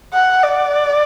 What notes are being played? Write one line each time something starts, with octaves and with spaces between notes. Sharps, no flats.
F#5
D5